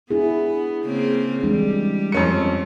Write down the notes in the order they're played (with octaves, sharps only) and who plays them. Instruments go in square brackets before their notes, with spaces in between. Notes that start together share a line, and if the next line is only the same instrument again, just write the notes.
[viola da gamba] B3 [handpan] D4 E4 G#4
[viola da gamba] C#3 A#3 C4
[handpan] E3 G#3 D4 [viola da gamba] G3
[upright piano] F2 C#4 C#7